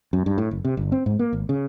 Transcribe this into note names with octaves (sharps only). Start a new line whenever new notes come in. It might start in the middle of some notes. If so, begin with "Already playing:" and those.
F#2
G2
A2
F#1
C3
G1
C4
G#2
A#3
G#1
C#3